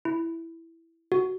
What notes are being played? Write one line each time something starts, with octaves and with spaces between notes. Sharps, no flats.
E4
F#4